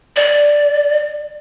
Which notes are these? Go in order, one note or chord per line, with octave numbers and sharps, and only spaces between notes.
D5